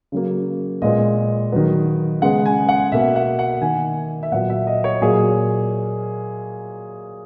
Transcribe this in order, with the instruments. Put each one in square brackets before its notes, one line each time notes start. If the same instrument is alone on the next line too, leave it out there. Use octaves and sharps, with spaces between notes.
[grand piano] C#3 F#3 A#3
A#2 G#3 B3 D#5
D#3 F#3 B3
C#3 G#3 B3 F#5
G#5
F#5
B2 A#3 E5
F#5
F#5
D#3 A#3 G#5
E5
A#2 F#3 B3 F#5
E5
D#5
C#5
A#2 F#3 A#3 G#4